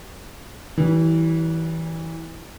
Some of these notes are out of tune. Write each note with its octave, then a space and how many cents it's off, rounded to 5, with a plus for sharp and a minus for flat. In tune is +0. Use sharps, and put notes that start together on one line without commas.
E3 -20 G3 -40